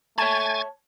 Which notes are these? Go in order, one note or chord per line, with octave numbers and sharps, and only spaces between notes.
A3 C#5 G#5 A5 C#6 G#6 A6